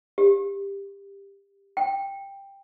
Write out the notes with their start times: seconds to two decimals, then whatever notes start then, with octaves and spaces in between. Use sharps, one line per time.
0.18 G4
1.77 G5